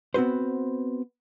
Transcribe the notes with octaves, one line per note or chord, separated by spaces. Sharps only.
B3 C4 F#4 B4 C5